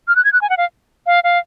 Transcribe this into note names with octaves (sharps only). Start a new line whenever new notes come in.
F6
F#6
G#6
F#6
G#5
F#5
F5
F5
F5